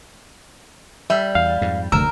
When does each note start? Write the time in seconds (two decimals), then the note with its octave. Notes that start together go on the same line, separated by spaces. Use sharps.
1.10 G3 E5
1.35 E2 F5
1.61 F2 G#2
1.92 F1 D2 G2 A3 A#4 E6